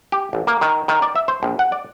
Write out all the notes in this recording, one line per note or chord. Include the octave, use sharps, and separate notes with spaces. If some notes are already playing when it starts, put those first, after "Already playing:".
G4
A1
A#3
D#3
D#3
D5
E5
C5
A#1
F#5
D5